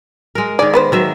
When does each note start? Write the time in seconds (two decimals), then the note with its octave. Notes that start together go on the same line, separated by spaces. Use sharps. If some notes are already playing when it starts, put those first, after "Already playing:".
0.35 G#3 A#4
0.59 D#3 G#4 D5
0.74 B3 B4 C5
0.92 D#3 F#3 E5